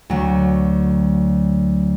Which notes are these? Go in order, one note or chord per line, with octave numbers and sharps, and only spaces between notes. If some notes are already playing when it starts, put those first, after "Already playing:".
D2 F#3